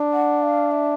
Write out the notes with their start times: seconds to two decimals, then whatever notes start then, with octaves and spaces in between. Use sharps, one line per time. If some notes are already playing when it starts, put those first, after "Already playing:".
Already playing: D4
0.13 F#5
0.43 F5
0.71 E5